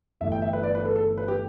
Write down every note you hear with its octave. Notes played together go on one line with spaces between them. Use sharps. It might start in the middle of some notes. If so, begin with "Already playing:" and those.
G1 G2 E3 A3 E5
G5
E5
B4
D5
B4
A4
A4
B4
G4